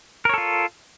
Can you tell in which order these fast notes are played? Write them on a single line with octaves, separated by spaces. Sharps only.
A#4 C#5 A4 F4